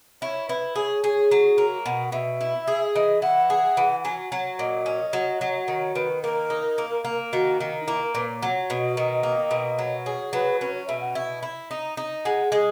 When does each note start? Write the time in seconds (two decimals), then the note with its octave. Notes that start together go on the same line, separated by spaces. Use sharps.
0.22 E4 C#5
0.48 E4 B4
0.75 G#4 C#5
1.04 G#4
1.31 F#3
1.58 A#3
1.86 B2 F#5
2.12 B2 E5
2.41 E4
2.67 G#4
2.95 E3 D#5
3.22 E4 F#5
3.50 G#4
3.77 E3
4.04 F#3 G#5
4.32 F#3 C#5
4.59 A#2 D#5
4.86 C#4
5.13 F#3
5.41 F#3
5.68 D#3 C#5
5.95 D#3 B4
6.22 A#3 A#4
6.50 D#4
6.78 A#3
7.05 A#3
7.32 D#3 F#4
7.60 D#3
7.81 D#4
7.87 A#3 E4
8.01 A#4
8.15 A#2 B4
8.28 C#5
8.42 F#3
8.60 C#5
8.70 B2
8.78 D#5
8.96 D#3 D#5
9.23 A#3
9.51 B2
9.78 F#3
10.06 G#4 C#5
10.33 F#3 B4
10.61 C#4 B4
10.74 C#5
10.88 B2 E5
11.01 F#5
11.15 E4
11.43 E4
11.71 D#4
11.97 D#4
12.25 G#3 F#5
12.52 G#3 G#4